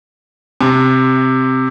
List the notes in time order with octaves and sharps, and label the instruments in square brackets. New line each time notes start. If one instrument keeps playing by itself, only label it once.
[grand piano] C3